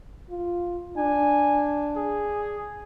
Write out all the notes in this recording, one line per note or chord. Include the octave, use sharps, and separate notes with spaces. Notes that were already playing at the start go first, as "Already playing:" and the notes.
F4
D4 G#5
G#4